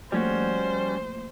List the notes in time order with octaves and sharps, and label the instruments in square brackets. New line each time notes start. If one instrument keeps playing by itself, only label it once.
[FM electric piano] F3 A3 A#3 [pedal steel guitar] G3 C#4 F#4 [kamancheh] C5